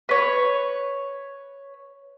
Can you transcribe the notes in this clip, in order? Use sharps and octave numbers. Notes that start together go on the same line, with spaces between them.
B4 C#5